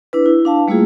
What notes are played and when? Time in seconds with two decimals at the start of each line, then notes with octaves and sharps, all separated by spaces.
0.13 D4 E4 B4
0.26 E4
0.45 D4 F5 A5
0.68 G3 A3 A#3 E4 F4 G#4